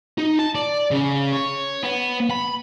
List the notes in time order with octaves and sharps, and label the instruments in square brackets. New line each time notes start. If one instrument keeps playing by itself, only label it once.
[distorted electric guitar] D#4
A5
D5
C#3
C#5
B3
B5